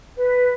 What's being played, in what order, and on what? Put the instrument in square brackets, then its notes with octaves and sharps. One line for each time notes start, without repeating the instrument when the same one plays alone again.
[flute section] B4